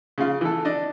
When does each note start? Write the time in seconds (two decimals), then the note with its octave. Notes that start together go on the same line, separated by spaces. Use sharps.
0.18 C#3 F4
0.41 E3 A4
0.65 D4 D#5